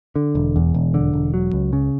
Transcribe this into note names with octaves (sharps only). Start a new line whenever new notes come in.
D3
E1
E2
E1
D3
E1
F#3
C#2
C#3